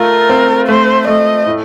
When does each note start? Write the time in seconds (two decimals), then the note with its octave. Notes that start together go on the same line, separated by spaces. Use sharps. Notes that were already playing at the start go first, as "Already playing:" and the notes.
Already playing: A3 F4 A#4
0.29 C4
0.68 A3 C5
1.07 A3 D#5
1.46 A2